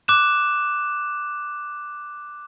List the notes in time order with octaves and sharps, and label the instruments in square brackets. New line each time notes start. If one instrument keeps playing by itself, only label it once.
[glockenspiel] D6 F#6 E7